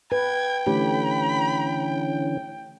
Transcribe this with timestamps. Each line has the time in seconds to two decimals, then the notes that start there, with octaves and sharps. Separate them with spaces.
0.12 B4 G5 G#6
0.67 D3 E3 A3 C#4 G4 B5